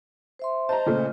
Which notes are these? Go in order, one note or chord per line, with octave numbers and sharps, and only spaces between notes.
C5 E5 C6
C5 D#5 A5 A#5
A#2 C#3 A3